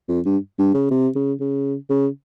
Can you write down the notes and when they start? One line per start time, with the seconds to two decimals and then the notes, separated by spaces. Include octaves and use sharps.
0.08 F2
0.25 G2
0.59 G2
0.74 C#3
0.91 C3
1.16 C#3
1.40 C#3
1.90 C#3